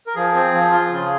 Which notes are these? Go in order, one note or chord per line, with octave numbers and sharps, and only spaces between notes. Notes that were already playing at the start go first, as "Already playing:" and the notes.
A#4
F3 G#4
C4
F3
F4
C#3